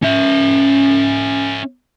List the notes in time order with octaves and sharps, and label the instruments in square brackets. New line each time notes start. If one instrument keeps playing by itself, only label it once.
[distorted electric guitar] C#4 E5